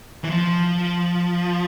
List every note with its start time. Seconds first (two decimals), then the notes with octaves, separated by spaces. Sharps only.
0.24 E3
0.30 F3